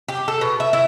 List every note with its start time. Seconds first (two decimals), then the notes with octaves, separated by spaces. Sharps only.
0.08 G4
0.28 A4
0.41 B2
0.60 E5
0.73 E4